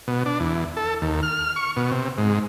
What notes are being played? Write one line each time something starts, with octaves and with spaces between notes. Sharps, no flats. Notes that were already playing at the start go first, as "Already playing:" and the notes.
B2
D4
E2
A4
D#2
F6
C#6
B2
C3
G#2